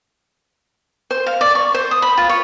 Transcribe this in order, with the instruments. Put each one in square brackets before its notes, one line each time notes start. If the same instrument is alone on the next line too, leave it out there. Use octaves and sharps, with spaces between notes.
[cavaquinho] C5
F5
D5
C#6
C5
D#6
B5
F4
C#5